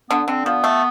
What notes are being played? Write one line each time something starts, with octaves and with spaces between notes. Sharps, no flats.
D3 B3
D3 C4
F3 B3
A3